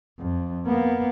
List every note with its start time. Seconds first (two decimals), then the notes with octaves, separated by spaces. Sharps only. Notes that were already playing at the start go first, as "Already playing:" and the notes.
0.19 F2
0.66 A#3 B3